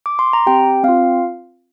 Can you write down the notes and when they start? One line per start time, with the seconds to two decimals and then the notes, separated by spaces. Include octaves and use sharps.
0.06 D6
0.19 C6
0.33 A#5
0.47 C4 G4 G5
0.84 C4 F4 F5